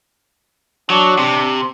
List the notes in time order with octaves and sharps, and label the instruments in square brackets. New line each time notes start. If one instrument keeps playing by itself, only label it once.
[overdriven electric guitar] F#3 [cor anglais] D4
[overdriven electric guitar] C3